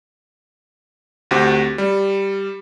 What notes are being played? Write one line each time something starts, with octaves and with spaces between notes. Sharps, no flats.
D2 C4 F#4 G4 C5
G3